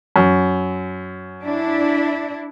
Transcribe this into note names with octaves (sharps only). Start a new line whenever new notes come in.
F#2
D4 E4